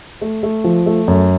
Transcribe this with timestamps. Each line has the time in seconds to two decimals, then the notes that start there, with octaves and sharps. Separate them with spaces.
0.21 A3
0.43 A3
0.64 F3
0.86 A3
1.08 F#2